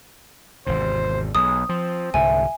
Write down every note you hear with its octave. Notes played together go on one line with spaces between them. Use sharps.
G#1 E2 C3 C5
B1 G#3 D#6
F3 C4
C2 G#2 D3 E5 G#5